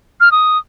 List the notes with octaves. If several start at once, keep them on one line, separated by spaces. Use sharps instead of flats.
F6
D#6